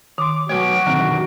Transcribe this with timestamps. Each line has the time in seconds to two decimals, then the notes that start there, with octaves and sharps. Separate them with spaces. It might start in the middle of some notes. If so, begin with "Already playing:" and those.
0.18 D#3 C6 D6
0.49 F#3 A3 F#4 B4 C#5 D7
0.87 B2 D3 D#3 F#3 C4 A#5